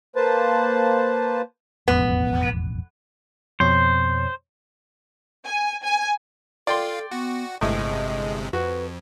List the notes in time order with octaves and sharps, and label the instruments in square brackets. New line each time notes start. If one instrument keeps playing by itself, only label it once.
[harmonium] A#3 B4 C5 A5
[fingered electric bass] E1 A1 F2 [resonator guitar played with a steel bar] B3
[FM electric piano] F2 B2 C#5 [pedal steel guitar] C5
[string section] G#5
G#5
[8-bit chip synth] F4 [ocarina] A4 [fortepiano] D5 G5 C6
[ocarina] B3 [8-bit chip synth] F#4
[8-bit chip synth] G1 C3 G#3 [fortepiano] A2 [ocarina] D#5
[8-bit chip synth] F2 [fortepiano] F#4 [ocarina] B4